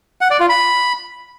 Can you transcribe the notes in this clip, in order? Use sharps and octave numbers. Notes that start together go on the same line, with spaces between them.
F#5
D5
F4
B5